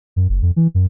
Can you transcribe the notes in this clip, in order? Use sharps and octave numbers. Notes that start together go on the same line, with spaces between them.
F#2
F#1
F2
E3
F#2